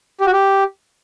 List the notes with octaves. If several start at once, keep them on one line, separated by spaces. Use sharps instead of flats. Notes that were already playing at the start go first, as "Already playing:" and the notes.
G4
F#4
G4